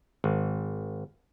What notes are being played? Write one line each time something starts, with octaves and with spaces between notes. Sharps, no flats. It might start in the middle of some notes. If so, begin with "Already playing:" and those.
G#1